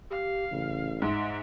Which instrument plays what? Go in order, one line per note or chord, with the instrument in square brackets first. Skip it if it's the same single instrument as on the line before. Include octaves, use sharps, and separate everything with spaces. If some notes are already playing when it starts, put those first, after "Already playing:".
[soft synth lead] G4 [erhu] F5
[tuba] A1 [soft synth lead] C#3
[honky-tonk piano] G#2 [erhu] E5 [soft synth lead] C6